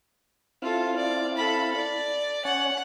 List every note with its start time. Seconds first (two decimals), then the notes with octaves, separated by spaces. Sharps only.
0.62 C4 E4 F4 A4 F5
0.96 D5
1.37 A4 B5
1.77 D5
2.45 C#4 C#5 F#5 G#5